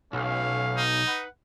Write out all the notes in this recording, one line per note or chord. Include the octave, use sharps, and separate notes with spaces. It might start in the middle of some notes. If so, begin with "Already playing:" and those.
B1 A3 C#4 F5
D#4
B4 F#5